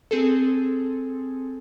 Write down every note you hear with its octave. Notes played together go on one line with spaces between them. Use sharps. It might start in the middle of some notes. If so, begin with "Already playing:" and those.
C4 G#4 A4